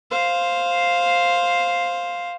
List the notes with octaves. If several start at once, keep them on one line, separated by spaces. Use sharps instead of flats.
C5 F5